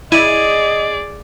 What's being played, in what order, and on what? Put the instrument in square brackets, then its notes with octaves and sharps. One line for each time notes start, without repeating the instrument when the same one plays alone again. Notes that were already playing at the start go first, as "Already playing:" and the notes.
[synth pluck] E4 [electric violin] G#4 D5 [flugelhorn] D#5 [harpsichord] G#5